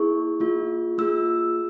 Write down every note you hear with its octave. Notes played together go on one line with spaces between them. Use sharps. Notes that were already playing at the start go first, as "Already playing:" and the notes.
Already playing: A#3 E4 G#4 C#6
A#3 F4 G#4
A#3 F4 G#4 E6